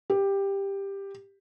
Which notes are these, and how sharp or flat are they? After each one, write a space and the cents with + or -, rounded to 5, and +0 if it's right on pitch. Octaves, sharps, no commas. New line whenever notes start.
G4 +10